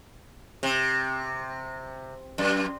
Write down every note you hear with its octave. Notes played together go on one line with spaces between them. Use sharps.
C3
F#2